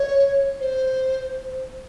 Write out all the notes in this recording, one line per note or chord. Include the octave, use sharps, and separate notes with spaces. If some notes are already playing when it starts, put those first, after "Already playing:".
Already playing: C#5
C5